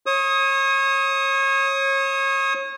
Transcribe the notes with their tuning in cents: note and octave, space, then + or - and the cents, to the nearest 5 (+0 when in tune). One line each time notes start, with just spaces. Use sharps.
C#5 -30 D#6 +20